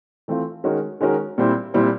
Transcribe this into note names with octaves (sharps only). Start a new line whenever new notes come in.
E3 A3 C4 F4
D#3 G#3 C#4 F#4 A#4
D#3 G#3 C#4 F#4 A#4
A#2 G3 C4 E4
A#2 G3 C4 E4